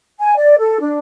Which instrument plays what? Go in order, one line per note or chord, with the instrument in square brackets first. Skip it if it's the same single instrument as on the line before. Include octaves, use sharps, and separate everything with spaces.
[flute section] G#5
D5
A4
D4